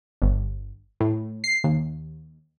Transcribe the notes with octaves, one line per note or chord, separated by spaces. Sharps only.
G1
A2
C7
D#2